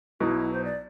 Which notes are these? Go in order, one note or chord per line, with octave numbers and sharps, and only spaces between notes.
B1 B2 F#3 E4
C5
D5